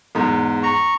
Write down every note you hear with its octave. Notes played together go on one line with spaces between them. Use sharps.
E2 G#2
A#5 C#6